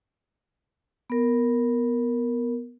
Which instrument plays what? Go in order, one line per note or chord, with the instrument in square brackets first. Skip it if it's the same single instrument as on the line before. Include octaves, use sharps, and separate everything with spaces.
[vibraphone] B3 A#4